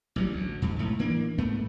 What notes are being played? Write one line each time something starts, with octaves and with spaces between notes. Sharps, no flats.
A1 F#3 G3
D2
F2 G#2
B1 A2 A3
E3 A#3 D4
G#2 A3 B3